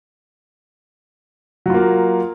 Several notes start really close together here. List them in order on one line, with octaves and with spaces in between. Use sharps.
F#3 F4 A#3